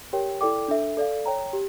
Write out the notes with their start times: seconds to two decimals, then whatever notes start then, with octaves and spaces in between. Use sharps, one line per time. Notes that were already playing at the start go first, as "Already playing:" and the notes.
0.13 G4 A#4 C#5 G5
0.41 E4 A4 D5 G5 D6
0.68 D4 A4 E5
0.97 A4 D5 F5
1.26 C#5 G5 A#5
1.53 G4